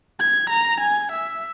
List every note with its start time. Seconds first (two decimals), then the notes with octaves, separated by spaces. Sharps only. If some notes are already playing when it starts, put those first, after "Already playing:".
0.20 G#6
0.50 A#5
0.81 G#5
1.12 E5